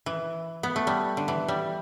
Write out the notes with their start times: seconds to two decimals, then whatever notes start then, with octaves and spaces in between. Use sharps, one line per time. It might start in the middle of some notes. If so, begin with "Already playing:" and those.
0.06 E3
0.63 B3
0.76 A3
0.87 G3
1.17 D3
1.28 E3
1.48 G3